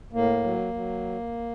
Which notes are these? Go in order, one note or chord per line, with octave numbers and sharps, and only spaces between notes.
A2 A#3
F#3
F#3